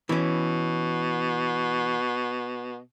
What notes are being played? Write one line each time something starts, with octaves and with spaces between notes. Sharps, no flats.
B2 E3 C#4